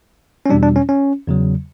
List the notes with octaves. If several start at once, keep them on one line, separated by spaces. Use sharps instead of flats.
C#4
E2 B2 G3 D4
D4
C#4
C#4
E2 C#3 F#3